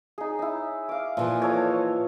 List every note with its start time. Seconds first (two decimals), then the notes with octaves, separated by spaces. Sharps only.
0.18 D#4 G#4
0.39 D#4 E4
0.89 F5 D6
1.17 A#2 E3 F3 G#5
1.40 A4 C#5 D#5